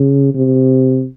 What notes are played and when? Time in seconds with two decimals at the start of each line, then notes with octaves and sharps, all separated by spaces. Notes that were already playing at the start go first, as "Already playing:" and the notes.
Already playing: C#3
0.34 C3